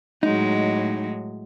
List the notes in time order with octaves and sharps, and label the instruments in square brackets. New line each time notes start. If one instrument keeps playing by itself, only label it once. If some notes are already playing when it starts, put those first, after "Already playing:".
[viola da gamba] A2 F#3 G#3 [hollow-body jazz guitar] D#4